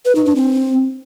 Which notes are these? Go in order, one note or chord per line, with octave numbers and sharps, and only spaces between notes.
B4
D#4
D4
C4